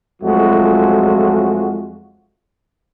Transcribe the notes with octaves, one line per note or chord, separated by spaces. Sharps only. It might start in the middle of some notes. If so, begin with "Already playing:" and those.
F2 F#3 G#3 A3 F4 F#4